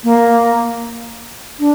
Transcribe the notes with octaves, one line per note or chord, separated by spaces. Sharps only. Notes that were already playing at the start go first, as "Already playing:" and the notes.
A#3
D4